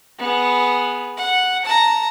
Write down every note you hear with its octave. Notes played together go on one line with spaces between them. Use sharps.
B3 G#4
F#5
A5 A#5